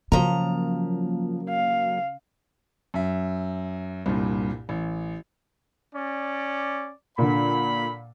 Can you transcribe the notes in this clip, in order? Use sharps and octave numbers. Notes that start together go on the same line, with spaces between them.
C#3 F3 F#3 A#3 A#5
F5
F#2 E5
C2 G2 A#2
A1
C#4 D5
A#2 D3 B5